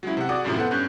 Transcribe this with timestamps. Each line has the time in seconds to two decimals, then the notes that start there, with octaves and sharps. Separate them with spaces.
0.03 F#3 G#3 C#4 E4
0.17 C3 F#5
0.29 F#4 G#4 D5 F#5 D6 D#6
0.44 A1 F#2 A2 C3 F3 E4
0.56 B3 A4 C5 F#5
0.71 G2 C#4 F#6 G6